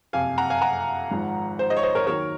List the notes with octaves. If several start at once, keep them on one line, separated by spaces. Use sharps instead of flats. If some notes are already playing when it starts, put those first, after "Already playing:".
F#1 F2 C3 F5 G#5
F#5 A#5
F5 G#5
F#5 A#5
G#1 G#2 F3
C5
C5 D#5
C#5
C5 D#5
A#4 C#5
D#2 D#3 F#3 A#4 C#5